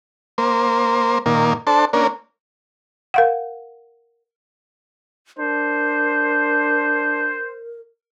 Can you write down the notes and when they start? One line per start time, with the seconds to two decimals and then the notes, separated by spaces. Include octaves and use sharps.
0.38 A#3 C5
1.26 A#2 D#3 A#3
1.67 D4 A4 C5 A5
1.93 A#3 C#4 D4 A#4
3.14 A#4 F5 F#5
5.39 D4 A#4 C5